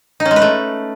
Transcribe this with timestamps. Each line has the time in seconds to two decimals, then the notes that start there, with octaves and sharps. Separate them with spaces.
0.20 D#4
0.25 C#4
0.31 G#3
0.36 B4
0.42 A3